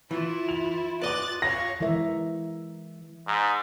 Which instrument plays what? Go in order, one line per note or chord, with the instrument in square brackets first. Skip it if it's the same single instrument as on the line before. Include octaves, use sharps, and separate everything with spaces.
[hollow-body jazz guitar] E3 [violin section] E4 [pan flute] F4
[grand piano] F7
[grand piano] B4 D6 [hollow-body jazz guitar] D5 D#5 [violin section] F#6 A6
[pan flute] C#5 [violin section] F5 C#6 [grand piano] A#6
[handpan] E3 G#3 A#4 E5
[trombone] G#2